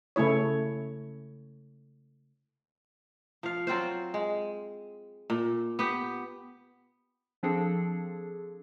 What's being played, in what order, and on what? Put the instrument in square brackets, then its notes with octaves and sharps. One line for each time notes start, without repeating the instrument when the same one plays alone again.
[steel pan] C#3 A3 E4 C#5
[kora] F3 F5
F#3 C4 F4 C5
G#3
A#2
B3 G4
[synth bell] F3 C4 D4 G#4 A4